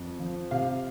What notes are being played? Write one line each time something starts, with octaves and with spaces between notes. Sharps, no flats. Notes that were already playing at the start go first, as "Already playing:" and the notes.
Already playing: F2
F3
C3 F5